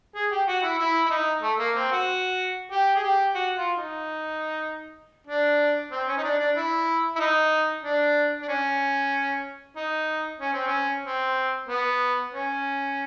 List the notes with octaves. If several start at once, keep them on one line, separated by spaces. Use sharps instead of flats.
G#4
G4
F#4
E4
E4
E4
D#4
A3
A#3
C4
F#4
G4
G#4
G4
F#4
F4
D#4
D4
C4
C#4
D#4
D4
D4
E4
E4
D#4
D4
D4
C#4
D#4
C#4
C4
C#4
C4
B3
C#4